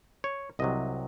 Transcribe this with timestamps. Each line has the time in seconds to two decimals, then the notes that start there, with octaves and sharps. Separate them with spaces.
0.24 C#5
0.59 C2 C3 F#3 D#5